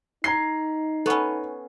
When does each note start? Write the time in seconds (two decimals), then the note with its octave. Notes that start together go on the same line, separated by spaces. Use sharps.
0.24 D#4 A#5 C6 G#6 C7
1.06 B3 C#4 A4 C#6